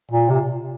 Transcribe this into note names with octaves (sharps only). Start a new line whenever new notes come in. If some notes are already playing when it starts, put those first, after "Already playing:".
A#2
C3